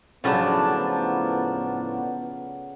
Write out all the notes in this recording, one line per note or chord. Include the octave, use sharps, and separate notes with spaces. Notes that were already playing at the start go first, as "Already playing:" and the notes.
A2 C#3 F3 F#3 B3 D4 A5